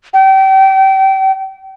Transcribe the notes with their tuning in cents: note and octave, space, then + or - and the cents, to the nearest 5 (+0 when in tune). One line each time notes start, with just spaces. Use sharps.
G5 -30